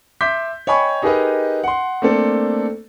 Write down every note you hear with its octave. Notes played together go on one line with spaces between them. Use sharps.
E5 C6 D6 G6 B6
C#5 D#5 G5 G#5 B5 C#6
D#4 G4 G#4 A#4 B4 D#5
F#5 C6
A3 A#3 C4 D4 A4